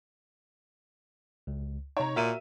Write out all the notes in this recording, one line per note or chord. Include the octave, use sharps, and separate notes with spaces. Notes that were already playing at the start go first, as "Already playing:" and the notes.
C#2
C3 D#4 C#5 A#5
A#2 F#4 A#4 E5 D#7